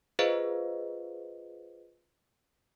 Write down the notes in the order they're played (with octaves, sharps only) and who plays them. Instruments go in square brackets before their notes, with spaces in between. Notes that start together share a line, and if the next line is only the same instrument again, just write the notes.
[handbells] F4 G#4 B4 C5 D#5 F5